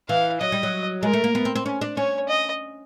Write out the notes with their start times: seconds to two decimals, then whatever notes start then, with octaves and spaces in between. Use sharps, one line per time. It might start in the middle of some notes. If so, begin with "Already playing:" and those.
0.09 E3 F5
0.40 F#3 D#5
0.52 G3
0.63 F#3
1.03 G#3 A#4
1.13 A3
1.24 A#3
1.35 B3
1.45 C4
1.55 C4
1.66 C#4
1.81 D4
1.97 C#4 C#5
2.28 D#5